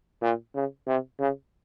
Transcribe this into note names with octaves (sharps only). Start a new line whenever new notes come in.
A#2
C#3
C3
C#3